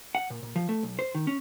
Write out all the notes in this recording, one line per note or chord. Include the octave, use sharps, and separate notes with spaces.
F#5
A#2
A#2
F3
A3
B1
C5
D#3
C#4